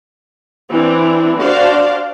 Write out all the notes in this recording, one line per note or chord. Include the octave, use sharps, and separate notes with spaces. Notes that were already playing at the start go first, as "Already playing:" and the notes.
E3 C4 D4
D4 F#4 C5 D5 F5